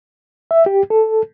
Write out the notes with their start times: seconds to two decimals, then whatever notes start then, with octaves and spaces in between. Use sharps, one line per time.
0.51 E5
0.66 G4
0.90 A4